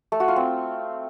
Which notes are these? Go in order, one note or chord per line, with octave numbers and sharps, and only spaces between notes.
A3
F#4
F4
C4